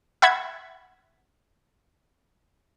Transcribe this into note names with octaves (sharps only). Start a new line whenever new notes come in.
E5 F#5 B5 G#6